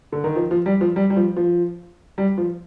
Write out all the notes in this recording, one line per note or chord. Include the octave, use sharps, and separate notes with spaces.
D3
D#3
F3
F3
G3
F3
G3
G3
F3
F3
G3
F3